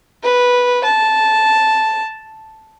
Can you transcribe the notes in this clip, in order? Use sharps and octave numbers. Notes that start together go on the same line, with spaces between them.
B4
A5